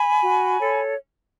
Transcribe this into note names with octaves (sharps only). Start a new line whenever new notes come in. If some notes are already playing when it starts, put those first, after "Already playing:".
Already playing: G#5 B5
F#4
A4 C#5